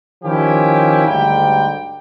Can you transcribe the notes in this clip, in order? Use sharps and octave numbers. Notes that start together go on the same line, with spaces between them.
D#3 F3 C#4 E4 G4
D2 G#2 G3 G5